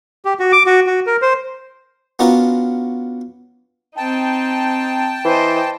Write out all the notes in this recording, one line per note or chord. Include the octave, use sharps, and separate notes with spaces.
G4
F#4
D6
F#4
F#4
A#4
C5
B3 C#4 D4 F4 F#4 A#4
C4 D#4 G5 A5
E3 C5 D#5